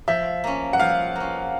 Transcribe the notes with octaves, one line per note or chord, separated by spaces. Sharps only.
F3 E5
A#3 C#4
F#5
F3 F5
A#3 C#4